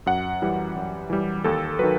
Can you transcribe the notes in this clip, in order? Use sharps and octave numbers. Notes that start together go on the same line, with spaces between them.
F#2 F#5
E3 G3
F#2
E3 G3
D#2 A4
D#3 F#3 B4